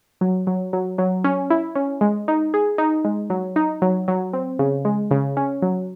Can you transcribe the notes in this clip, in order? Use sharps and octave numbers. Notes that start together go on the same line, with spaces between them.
F#3
F#3
F#3
F#3
C#4
E4
C#4
G#3
D#4
G#4
D#4
G#3
F#3
D#4
F#3
F#3
C4
C#3
G#3
C#3
C#4
F#3